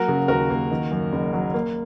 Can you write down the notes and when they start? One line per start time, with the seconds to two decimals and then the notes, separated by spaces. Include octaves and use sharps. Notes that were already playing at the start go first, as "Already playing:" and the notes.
Already playing: F#3 A#3 F#4 A#4
0.08 C#3
0.28 D#2 F#4 A#4
0.50 A#3
0.71 D#3
0.91 F#2
1.13 F#1
1.33 F#3
1.54 A#3